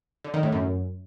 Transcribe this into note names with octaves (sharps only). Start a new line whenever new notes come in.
D3
D#3
A2
F#2